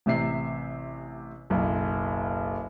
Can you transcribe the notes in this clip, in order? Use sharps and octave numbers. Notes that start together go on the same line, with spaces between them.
A1 C3 E5 C7
F#1 B1